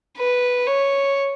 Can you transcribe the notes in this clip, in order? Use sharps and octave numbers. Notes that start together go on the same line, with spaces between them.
B4
C#5